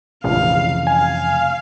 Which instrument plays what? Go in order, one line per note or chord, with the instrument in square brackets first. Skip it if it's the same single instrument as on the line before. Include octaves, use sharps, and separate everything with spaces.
[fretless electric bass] F1 C#3 E3 [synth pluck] A#1 [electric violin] F5
[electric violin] F5 [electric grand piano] G#5